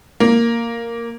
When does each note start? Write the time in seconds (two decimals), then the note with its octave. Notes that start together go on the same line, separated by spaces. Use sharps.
0.20 A#3